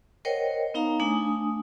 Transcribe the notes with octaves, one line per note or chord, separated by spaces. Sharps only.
A#4 C5 C#5 D#5 F#5 G5
B3 D#4 F5 A#5
A3 D4 G#5 D#6